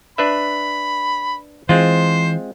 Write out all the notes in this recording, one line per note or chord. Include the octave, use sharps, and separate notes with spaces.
D4 B4 E5 B5
E3 G#3 C4 F4 C5